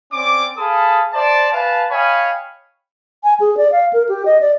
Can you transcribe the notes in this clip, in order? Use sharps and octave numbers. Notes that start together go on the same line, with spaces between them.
C4 C#4 D5 D6
G#4 A4 F5 A5 B5 D#6
C5 D5 E5 A5
B4 F5 G#5 A5
C#5 D#5 F5 G5 G#5 B5
G#5
G#4
D5
F5
A#4
G4
D#5
D5